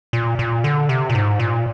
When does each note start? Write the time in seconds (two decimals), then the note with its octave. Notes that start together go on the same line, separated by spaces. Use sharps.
0.13 A#2
0.39 A#2
0.64 D3
0.89 C3
1.09 A#2
1.15 G#2
1.39 A#2